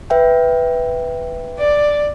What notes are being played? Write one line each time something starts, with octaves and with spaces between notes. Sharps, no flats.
B4 E5 G5
D5